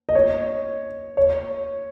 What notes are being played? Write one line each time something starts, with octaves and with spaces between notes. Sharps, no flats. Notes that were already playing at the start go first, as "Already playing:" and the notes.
D#5
C#5
C#5